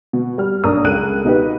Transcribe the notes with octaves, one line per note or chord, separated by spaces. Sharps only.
B2
G3 F6
B1 A#3 D4 A#5 D#6
C#2 A4 A#4 F#6 D#7
B2 D#4 G4 B4